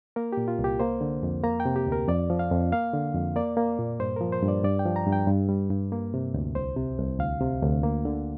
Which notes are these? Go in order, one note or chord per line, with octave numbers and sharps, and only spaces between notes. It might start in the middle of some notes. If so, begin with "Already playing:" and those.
A#3 A#4
A#2 G4
F4
C2
G4
A#3 C5
D3
F2
A#3 A#5
G5
C3
G4
D2
A#4
F2 D5
F3
F5
F2
A#3 F5
D3
F2
A#3 D5
A#3
A#2
G2 C5
F3 A#4
C5
G2
D5
G2 D5
G5
F3
A#5
G2
G5
G2
G3
G2
A#3
C3
D2
C2 C5
C3
C2
D2 F5
C3
D2
A#3
D3